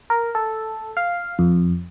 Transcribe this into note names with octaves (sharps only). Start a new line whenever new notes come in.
A#4
A4
F5
F2